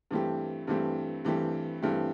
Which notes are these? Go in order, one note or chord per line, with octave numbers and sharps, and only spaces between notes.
G2 E3 A3 C4 G4
G2 E3 A3 C4 G4
G2 E3 A3 C4 G4
G2 E3 A3 C4 G4